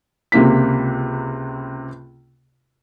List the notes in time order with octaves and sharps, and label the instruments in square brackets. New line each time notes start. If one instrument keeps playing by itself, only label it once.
[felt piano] C#2 C3 A#3 B6